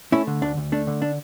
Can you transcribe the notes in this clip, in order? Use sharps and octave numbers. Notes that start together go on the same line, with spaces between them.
A3 C#4 E4
D3
D2 D4
D2
A3 D4
D3
D4